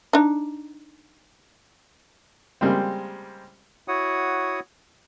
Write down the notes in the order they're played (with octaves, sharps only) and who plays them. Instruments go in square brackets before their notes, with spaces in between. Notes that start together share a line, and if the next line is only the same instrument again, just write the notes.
[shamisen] D4 D#4
[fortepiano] C#3 G3 G#3 A#3 C4
[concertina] E4 F#4 C#5 F#5 D#6